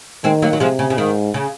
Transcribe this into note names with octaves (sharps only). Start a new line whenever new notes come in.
D#3 G#3 C4
F#3 A#3
F#3
C3 F3 G#3
C#3
C#3
G#2 D#3
C#3